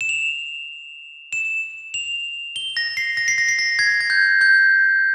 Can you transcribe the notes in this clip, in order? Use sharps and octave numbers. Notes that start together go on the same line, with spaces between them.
E7
F7
E7
F7
G7
A#6
C7
A#6
C7
A#6
C7
A#6
G#6
G#6
G6
G6